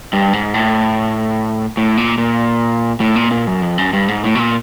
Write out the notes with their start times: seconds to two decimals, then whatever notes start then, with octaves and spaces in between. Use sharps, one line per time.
0.13 G2
0.33 G#2
0.54 A2
1.77 A2
1.97 A#2
2.18 A#2
3.00 A2
3.16 A#2
3.31 A#2
3.47 F#2
3.62 F2
3.78 F#2
3.93 G2
4.08 G#2
4.24 A2
4.35 B2
4.39 A#2